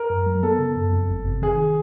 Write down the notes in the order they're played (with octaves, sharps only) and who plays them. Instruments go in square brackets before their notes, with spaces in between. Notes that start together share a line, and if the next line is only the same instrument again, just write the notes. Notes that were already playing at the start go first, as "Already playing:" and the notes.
Already playing: [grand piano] A#4
[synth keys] F#2
F#3
[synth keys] B3 [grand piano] A4
[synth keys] C#3
F#2
F2
G1
C3
[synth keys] D#3 [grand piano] G#4